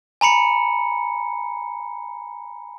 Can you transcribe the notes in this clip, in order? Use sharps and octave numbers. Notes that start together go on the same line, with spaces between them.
G#5 A#5 B5 C#7